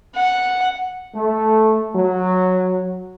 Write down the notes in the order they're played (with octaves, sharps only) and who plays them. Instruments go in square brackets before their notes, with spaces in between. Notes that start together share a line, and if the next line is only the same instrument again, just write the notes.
[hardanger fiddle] F#5
[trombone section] A3
F#3